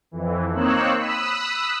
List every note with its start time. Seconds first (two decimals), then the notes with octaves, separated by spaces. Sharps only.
0.11 F2 E3
0.51 A#3 C4 D#4 C#5 E6 F#6
0.98 B5 D#6 E6 F#6